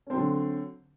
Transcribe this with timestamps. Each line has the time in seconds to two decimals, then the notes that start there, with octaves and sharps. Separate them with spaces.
0.07 C#4
0.10 C4
0.13 F#3
0.17 D3